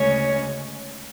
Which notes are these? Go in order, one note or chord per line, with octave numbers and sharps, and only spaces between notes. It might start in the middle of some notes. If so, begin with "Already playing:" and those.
Already playing: D2 C#3 G#3 C#4 C#5